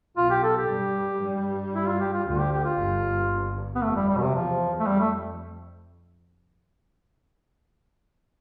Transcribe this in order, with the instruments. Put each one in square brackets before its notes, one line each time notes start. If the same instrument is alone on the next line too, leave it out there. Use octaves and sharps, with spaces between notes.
[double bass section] B1 B2 [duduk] F4
[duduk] G4
A4
G4
[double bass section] G2 G3
G2 G3
[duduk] E4
F4
G4
F4
[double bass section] D2 D3 [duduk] F4
[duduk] G4
G4
F4
[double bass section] G1 G2
[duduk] B3
[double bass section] F2 [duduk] A3
[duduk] G3
G3
B2
C3
[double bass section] E2 [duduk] F3
[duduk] A3
[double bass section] F2 [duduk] G3
[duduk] A3